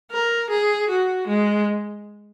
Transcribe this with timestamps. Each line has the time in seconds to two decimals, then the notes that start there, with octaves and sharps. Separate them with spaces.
0.11 A#4
0.50 G#4
0.89 F#4
1.27 G#3